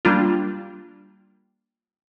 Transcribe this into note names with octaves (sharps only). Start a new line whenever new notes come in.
G3 A#3 D4 F4